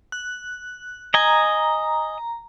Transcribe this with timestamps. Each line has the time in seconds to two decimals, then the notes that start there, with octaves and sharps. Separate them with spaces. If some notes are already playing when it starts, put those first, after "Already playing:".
0.12 F#6
1.14 D#5 G#5 A#5